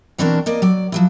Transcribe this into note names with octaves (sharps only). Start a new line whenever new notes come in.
B2 E3 C4 D4 F#4 A#4
A#3 D5 D#5
F#3 D5
F3 F#3 E4